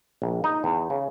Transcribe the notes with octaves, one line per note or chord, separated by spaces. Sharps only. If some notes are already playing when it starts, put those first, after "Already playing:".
A#1
D#4
E2
C#3